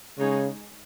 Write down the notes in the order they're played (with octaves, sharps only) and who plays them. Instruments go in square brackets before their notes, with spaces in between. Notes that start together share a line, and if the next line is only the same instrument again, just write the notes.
[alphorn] C#3 [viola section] G#3 D#4 G#4 C#5